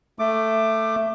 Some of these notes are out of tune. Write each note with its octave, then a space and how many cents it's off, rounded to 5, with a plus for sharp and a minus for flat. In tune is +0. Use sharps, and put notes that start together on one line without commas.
A3 +10 D6 +15